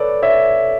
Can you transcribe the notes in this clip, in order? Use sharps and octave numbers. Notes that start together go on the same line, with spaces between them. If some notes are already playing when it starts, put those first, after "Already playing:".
Already playing: A4 B4 C#5 D5
C#5 E5